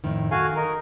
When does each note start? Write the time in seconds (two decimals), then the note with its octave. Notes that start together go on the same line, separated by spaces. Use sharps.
0.04 F2 A2 D#3
0.31 D#3 F#4 A4 F5 G#5
0.56 D#4 A#4